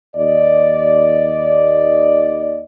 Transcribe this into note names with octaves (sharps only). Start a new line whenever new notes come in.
D#2 D5 D#5